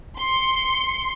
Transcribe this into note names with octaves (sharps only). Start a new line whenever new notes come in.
C6 C#7